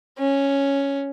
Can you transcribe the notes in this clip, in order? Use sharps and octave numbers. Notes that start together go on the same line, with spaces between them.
C#4